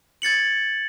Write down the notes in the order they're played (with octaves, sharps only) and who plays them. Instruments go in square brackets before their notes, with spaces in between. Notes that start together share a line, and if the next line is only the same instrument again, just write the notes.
[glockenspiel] G#6 A6 C#7 F#7